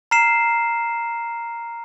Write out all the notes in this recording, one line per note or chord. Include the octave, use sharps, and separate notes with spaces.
A#5 F6 C7 E7